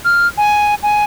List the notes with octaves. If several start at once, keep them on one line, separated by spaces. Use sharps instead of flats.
F6
G#5
G#5